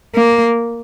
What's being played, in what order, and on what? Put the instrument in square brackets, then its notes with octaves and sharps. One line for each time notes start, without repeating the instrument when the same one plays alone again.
[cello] A#3